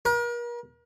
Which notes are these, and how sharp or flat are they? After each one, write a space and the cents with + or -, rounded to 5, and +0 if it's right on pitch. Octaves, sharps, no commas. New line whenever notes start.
A#4 +40